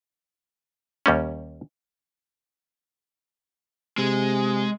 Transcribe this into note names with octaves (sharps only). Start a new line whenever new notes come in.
D#2 G3 C#4
C3 G#3